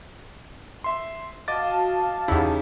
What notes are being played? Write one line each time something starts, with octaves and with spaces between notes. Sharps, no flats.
E5 C6
F#4 D#5 F5 A5 D6 A6
E2 C#3 D#4 E4 G4